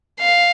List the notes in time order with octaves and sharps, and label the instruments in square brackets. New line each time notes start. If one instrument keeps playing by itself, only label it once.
[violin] F5